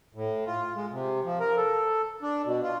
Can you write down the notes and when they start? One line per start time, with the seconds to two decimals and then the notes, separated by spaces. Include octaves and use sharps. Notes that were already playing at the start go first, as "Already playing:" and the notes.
0.15 A2
0.46 F4
0.76 G#3
0.91 C3
1.24 F3
1.40 A#4
1.57 A4
2.22 D4
2.46 B2
2.62 F4